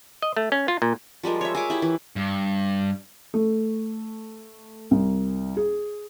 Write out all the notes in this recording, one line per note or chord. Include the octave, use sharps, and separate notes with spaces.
D#5
A3
C#4
F4
A#2
F3 G3 G#3 A#4
C#5 E5
G#4 C#5 D6
E4 G4
E3
G2
A3
C2
G#4